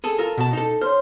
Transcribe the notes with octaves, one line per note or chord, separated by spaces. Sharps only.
G#4 A4
F4 A4 A#4
B2 A5
D#4 A4
C5 C#5 C6 F6